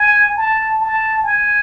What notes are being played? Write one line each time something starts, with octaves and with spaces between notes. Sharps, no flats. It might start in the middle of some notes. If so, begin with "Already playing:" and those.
Already playing: G#5
A5
A5
G#5